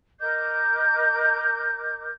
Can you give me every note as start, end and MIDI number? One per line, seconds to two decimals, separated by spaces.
0.20 2.10 70
0.20 2.10 75
0.20 2.10 86
0.20 2.10 91